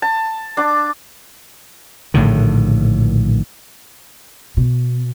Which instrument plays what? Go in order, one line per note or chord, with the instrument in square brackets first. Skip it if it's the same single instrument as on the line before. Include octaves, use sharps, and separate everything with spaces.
[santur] A5
D4 D6
[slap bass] A#1 A2 D3 D#3
[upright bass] B2